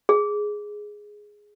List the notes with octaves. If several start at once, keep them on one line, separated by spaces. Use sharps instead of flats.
G#4